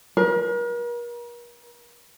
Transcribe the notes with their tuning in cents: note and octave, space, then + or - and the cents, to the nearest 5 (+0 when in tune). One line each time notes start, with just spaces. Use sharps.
A#4 +40